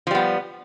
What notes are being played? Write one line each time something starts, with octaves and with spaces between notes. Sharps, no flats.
F3 G3 B3